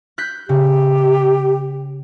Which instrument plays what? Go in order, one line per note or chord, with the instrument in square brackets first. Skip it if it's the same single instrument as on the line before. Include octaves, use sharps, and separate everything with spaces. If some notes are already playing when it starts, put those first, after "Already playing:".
[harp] F#6 G6 B6
[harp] C#3 [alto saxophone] G4